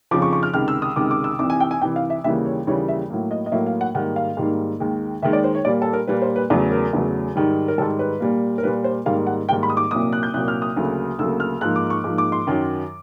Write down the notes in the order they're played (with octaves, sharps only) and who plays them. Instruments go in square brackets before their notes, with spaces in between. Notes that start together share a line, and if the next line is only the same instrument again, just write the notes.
[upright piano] F2 C#3 F3 D6
C#6
C#6
F6
C#2 C3 D#3 G#3 F6
E6
D#6
C#2 C3 D#3 G#3 D6
D6
E6
C2 C3 E3 D6
G#5
G5
G#5
C2 C3 E3 G5
F5
E5
D#2 C#3 E3 G3 A#3 E5
C#5
D#2 C#3 E3 G3 A#3 C#5
E5
A2 F#3 A#3
D#5
D#5
A2 F#3 A#3 E5
F5
F#5
G#2 D#3 G3 A#3 F#5
F5
G#2 D#3 G3 A#3
D#2 D#3 G#3
D#2 D#3 G#3 E5
D5
C5
C#5
A#2 G3 A#3 D5
A4
A#4
A#2 G3 A#3 B4
C5
B4
E2 C#3 F#3 A3
A#4
E2 C#3 F#3 A3
G#2 D#3 G3
A#4
G#2 D#3 G3 A4
B4
A#2 G3 A#3
A#4
A#2 G3 A#3 B4
C5
G#2 D#3 G3 A#3 F5
F#5
G#2 D#3 G3 A#3 G5
B5
D#6
D6
C2 A#2 F#3 A#3 D#6
F#6
G6
C2 A#2 F#3 A#3 F#6
F6
D#6
D2 C#3 F#3 A#3
D2 C#3 F#3 A#3 E6
F6
G#2 F3 A#3 F#6
D6
C#6
G#2 F3 A#3 D6
D6
C6
F#2 D#3 F#3